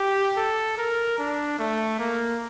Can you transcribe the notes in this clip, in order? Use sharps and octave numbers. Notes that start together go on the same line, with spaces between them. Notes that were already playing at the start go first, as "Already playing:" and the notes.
Already playing: G4
A4
A#4
D4
A3
A#3